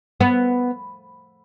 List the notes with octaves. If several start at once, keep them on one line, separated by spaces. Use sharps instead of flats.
B3